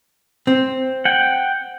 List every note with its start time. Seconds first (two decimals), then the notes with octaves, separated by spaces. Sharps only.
0.47 C4
1.05 F#5 G5